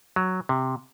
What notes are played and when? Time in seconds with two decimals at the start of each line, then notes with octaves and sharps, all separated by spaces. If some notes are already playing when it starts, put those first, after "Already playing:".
0.16 F#3
0.49 C3